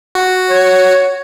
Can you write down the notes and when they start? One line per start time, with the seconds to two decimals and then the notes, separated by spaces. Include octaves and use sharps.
0.15 F#4
0.50 C#5